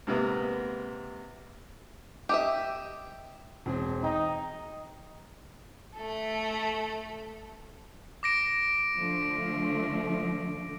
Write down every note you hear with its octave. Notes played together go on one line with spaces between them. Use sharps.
G#2 C3 A#3 B3
G4 D#5 E5
E1 C4 G#4
D#4 G5
A3 A4
D6 A#6 D7
D3 F3 A3